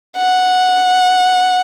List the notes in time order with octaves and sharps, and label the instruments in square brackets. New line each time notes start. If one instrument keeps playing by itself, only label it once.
[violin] F#5